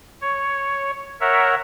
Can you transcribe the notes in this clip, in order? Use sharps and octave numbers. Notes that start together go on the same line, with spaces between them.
C#5
A#4 C#5 E5 F#5